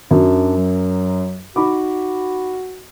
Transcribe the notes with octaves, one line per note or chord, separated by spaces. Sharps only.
F#2 D4
F#3
D#4 F#4 B5 D6